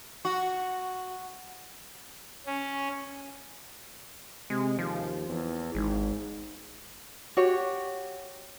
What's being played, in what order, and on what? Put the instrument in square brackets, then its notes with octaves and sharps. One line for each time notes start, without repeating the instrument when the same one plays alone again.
[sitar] F#4
[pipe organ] C#4
[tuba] C3 [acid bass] G#3
[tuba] D#2 [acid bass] F3
[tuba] E2
[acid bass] G#1 [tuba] G#2
[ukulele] F#4 G4 C#5